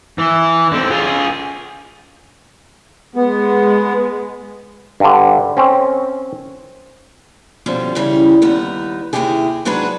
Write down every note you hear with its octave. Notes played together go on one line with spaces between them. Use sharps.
E3
D3 C4
F4 G#4
G#3 B3
G2 D3
C4 C#4
B2 D3 F3 G3 C#4
C#3 E3 G3 C#4
D#2 G3 B3 D#4
D#2 G#2 C3 E4 G4 G#4
G#2 F#3 D4 F#4 G#4 B4